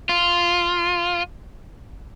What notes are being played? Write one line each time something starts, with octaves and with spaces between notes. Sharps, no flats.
F4